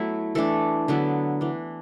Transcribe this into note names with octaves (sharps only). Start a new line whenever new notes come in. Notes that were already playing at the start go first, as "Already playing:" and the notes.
Already playing: F#3 A3 B3 E4
E3 A3 D4 A4
D3 F#3 B3 E4
E3 D4